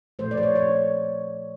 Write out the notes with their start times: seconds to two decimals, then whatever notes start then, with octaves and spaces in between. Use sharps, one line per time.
0.19 A#2 F3 A3 C5
0.31 D5
0.37 C5
0.43 C#5
0.56 C#5